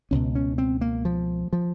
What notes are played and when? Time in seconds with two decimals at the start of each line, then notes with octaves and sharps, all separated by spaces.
0.11 C#2 B2 C#4
0.35 C#4
0.58 C4
0.81 A#3
1.05 F3
1.53 F3